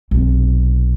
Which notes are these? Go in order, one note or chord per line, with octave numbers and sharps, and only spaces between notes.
B1 C3